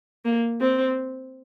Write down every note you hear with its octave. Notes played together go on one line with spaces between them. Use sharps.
A#3
C4